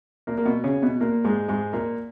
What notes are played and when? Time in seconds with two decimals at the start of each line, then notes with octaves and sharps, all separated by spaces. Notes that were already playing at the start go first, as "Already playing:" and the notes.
0.27 A#2 A#3
0.38 A#3
0.45 B2 B3
0.64 C#3 C#4
0.82 B2 B3
1.01 A#2 A#3
1.25 G#2 G#3
1.48 G#2 G#3
1.73 A#2 A#3